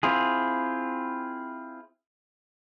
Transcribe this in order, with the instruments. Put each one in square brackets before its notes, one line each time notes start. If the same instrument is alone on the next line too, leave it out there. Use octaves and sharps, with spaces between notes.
[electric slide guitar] C4 E4 F4 G#4